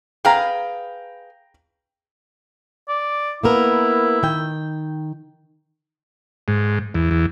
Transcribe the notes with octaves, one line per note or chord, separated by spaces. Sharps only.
G#4 B4 F5 G5 A#5
D5
A#3 B3 E4 A#4
D#3 G5
G#2
E2
E2